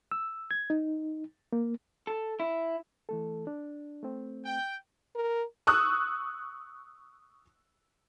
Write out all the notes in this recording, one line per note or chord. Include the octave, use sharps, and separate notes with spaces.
E6
G#6
D#4
A#3
A4
E4
E3 A3 A4
D4
A3 C4
G5
A#4
C#6 D#6 E6 F#6